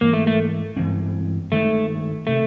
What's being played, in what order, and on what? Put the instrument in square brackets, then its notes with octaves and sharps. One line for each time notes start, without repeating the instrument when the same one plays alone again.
[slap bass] G#2 E3 G#3 [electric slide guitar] A#3
[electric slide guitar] A3
A3
[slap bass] G2 E3 G#3 C4
[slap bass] G2 D#3 G#3 [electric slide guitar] A3
[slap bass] C3 D#3 [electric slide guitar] A3